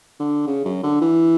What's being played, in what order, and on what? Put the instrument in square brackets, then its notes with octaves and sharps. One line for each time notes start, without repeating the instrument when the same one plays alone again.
[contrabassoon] D3
C#3
F#2
D3
E3